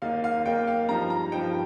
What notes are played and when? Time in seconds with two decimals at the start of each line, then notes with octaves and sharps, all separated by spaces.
0.02 D#2 D#3 A#3 D#4 F5
0.24 F5
0.45 D#2 D#3 A#3 D#4 G5
0.68 F5
0.89 G2 F3 D#4 A#5
1.10 A#5
1.32 G2 F3 D#4 G5